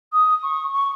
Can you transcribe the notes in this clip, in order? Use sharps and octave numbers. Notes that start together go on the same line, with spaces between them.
D#6
C#6
C#6